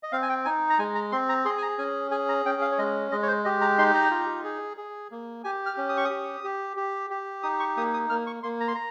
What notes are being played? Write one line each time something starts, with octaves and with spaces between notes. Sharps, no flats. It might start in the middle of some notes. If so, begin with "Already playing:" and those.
D#5
C4 F5
G#5
G5
D#4 G#5
A#5
G#3 G#5
A#5
C4 C6
A#5
G#4 C6
G#5
A#5
C#4 G#5
G#4 G#5
A#5
C#4 G5
F5
C#5
G#3 D#5
G#3 D#5
C#5
C5
G4 D#5
A#5
D#4 C6
A#5
F4
G#4
G#4
A#3
G4 G#5
F6
C#4
D#6
C#6
D#6
G4
G4
G4
G4
D#4 D#6
C#6
A#3 D#6
D#6
A#3 F6
C#6
A#3 C6
A#5
C6
A#5